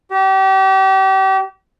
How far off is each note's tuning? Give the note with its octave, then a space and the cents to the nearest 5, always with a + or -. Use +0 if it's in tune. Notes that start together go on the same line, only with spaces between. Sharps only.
G4 -35